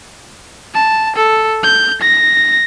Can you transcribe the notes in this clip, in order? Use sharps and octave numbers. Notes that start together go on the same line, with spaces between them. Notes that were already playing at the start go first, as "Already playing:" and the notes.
A5
A4
G6
A#6